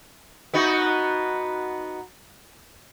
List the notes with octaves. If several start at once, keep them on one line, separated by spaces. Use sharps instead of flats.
B3 D#4 F#4